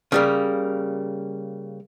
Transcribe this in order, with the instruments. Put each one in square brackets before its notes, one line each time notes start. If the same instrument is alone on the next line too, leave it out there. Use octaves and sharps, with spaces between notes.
[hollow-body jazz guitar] C#3 G3 A#3